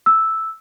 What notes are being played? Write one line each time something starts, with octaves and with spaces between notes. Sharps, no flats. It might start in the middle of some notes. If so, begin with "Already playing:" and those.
E6